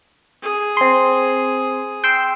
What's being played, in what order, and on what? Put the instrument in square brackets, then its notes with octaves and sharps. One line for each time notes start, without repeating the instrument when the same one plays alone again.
[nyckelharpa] G#4
[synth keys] C4 C6
G5 C6 E6